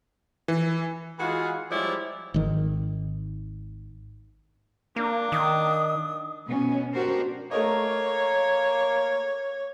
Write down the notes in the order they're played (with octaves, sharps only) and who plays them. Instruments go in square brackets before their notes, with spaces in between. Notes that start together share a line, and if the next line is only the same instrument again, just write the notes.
[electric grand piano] E3
[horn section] E3 G#3 F4 F#4 G#4
F3 G3 G#3 E4 C#5 D5
[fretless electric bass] G#1 D#3
[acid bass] A#3 [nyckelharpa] D4
[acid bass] D#3 [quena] D#6
[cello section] B2 B3 C#4
B3 D4 F#4 G4 A#4 C5
[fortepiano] A3 A#4 D#5 [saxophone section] A#3 [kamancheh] C#5